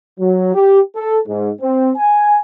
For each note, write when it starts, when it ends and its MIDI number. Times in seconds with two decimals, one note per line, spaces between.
0.20 0.53 54
0.54 0.80 67
0.96 1.18 69
1.27 1.50 44
1.61 1.91 60
1.96 2.39 80